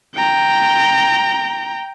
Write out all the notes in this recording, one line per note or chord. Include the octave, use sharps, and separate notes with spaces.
G5 A#5